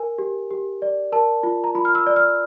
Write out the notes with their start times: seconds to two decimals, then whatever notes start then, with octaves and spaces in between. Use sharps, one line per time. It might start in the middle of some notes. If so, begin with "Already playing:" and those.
Already playing: A#4 G#5
0.18 G4
0.51 G4
0.82 D5
1.12 A#4 A5
1.43 F4
1.64 A#5
1.75 F4 B5
1.85 F6
1.95 E6
2.07 D5
2.16 F6